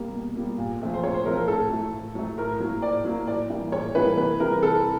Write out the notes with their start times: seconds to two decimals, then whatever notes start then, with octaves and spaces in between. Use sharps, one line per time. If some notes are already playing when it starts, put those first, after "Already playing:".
Already playing: B2 G3 A#3
0.13 B2
0.35 G3 A#3
0.58 A#2
0.80 F3 A3 C4
0.93 C5
1.03 A#2 C#5
1.14 C5
1.25 F3 A3 C4 A#4
1.37 A#4
1.48 A2 A4
1.70 F#3 A3
1.93 A2
2.15 F#3 A3
2.38 A2 A#4
2.60 F#3 A#3
2.82 A2 D5
3.05 F#3 A#3
3.27 A2 D5
3.50 E3 G3 A#3
3.72 A2 C#5
3.95 E3 G3 A#3 B4
4.17 C3 B4
4.40 E3 G3 A#4
4.62 C3 A4